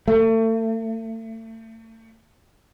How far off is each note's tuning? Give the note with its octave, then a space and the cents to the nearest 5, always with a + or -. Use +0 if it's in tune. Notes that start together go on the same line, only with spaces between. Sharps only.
A3 +35